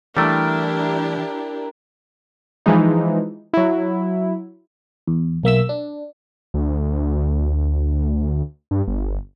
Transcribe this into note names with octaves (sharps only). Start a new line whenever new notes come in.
E3 G3 A3 D4 E4 G4 A#4 G5
E3 F3 G#3 D#4
F#3 E4
E2
B1 A#3 E5 E6
D4
D2
G2
G1